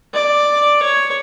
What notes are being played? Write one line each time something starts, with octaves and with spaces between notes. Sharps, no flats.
D5
C#5